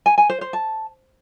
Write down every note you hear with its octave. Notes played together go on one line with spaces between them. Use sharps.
G#5
G#5
C5
C5
A5